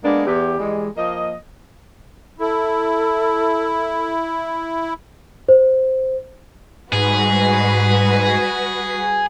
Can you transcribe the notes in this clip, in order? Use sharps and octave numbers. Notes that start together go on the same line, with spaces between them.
G#3 A#3 B3 D4
E2 G4
E3 G3 G#3
F3 A#3 D#5
E4 A4
C5
G#2 G3 F#4 G#4 B4